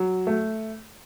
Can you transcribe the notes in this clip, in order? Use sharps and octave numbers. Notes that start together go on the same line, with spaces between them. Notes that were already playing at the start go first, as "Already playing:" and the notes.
Already playing: F#3
A3